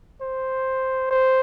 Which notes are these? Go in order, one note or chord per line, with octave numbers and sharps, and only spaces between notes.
C5
C5